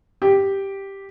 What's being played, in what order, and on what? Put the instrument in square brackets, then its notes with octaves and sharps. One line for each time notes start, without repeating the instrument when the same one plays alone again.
[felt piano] G4